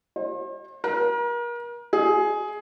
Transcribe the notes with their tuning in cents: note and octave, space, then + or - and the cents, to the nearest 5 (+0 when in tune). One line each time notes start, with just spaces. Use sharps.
C5 +40
A#4 +35
G#4 +15